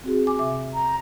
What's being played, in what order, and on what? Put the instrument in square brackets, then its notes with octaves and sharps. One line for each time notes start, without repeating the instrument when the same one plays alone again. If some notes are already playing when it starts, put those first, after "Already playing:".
[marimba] C4 F#4 G#4
G#5 D6
C3 E5 D6
[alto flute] A#5